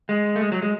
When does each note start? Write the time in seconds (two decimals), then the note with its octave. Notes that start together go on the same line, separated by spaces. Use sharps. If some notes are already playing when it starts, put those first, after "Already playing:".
0.09 G#3
0.36 A3
0.41 G#3
0.52 F#3
0.62 G#3